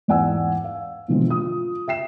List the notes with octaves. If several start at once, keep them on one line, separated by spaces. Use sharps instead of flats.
E2 G#2 D5 F#5 G#5 E6
F5
B2 D3 E3 F3 G#3 C4
F4 D#6
E5 G5 C7 E7